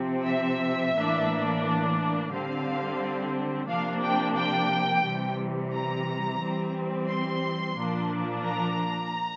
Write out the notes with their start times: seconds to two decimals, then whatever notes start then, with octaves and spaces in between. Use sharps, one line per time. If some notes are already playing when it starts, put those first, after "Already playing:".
Already playing: C3 F3 C4
0.27 E5
0.95 A2 E3 A#3 D4
2.31 D3 G3 C4 F5
3.68 C3 F3 A#3 D4 F5
4.02 G5
4.36 G5
5.04 C3 E3 G3
5.73 A#5
6.41 E3 G3 C4
7.09 C6
7.77 A#2 F3 A#3 D4
8.45 A#5